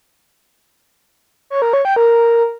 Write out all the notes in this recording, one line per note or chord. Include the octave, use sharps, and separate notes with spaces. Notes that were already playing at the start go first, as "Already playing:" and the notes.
C#5
A#4
C#5
G5
A#4